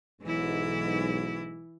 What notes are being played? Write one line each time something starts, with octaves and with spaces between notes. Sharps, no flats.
B1 G#2 E3 E4